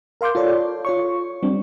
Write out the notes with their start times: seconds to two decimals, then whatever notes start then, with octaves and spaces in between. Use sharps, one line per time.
0.21 A#4 F5 C6 D6 G6
0.35 F4 A4 C#5 D5
0.85 F4 C#5 C#6
1.43 G3 C4 D4